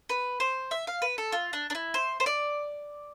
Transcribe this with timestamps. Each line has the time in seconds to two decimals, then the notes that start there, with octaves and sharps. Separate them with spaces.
0.09 B4
0.40 C5
0.71 E5
0.87 F5
1.02 B4
1.18 A4
1.32 F4
1.53 D4
1.70 D4
1.75 E4
1.94 C5
2.20 C5
2.26 D5